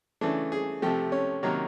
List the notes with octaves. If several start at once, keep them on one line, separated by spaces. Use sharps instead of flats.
C#3 E3 A3 D4
G#4
C3 F3 A3 G4
C#4
C3 D#3 F#3 A#3